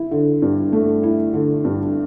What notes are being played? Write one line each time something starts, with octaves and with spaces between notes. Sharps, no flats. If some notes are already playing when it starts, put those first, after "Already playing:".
Already playing: E4
D3
G2
A3
E4
D3
G2